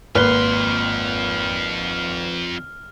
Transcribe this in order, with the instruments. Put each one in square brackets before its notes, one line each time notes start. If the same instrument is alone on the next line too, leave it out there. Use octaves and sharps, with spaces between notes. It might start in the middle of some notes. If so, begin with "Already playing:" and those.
[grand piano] G#1 [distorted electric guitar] F2 C6 [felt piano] A#3 B4 [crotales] F6